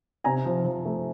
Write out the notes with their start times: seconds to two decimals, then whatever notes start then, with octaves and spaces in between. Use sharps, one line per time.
0.24 C3 G#5 A#5
0.45 F3
0.65 F3
0.85 A3